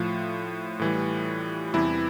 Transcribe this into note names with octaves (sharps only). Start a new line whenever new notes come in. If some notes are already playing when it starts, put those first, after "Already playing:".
Already playing: A2 F3 F4
A2 E3 G3
E2 C3 E3 G3 E4